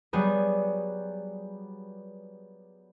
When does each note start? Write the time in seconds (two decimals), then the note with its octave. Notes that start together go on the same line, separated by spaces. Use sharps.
0.13 F#3 G3 B3 G#4